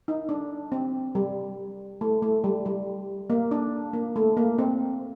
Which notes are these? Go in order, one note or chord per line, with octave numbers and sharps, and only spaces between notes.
D#4
D4
C4
G3
A3
A3
G3
G3
A#3
D4
A#3
A3
A#3
C4